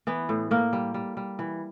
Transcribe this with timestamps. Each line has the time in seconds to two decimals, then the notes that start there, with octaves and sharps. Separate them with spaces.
0.07 E3 B3
0.29 A2
0.51 A2 A#3
0.73 G3
0.94 G3
1.17 G3
1.39 E3